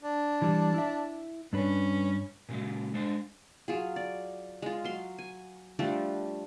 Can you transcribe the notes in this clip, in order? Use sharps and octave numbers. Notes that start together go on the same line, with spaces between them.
D4
E3 G3
E4 E5
G2 C#4 D4 B4
A#2 C#3 F#3 G#3
G#3 D4 C5
F#3 F4 G#4
D5
G#3 F4
F#3 F5 C6
G#5
F3 G3 A3 D4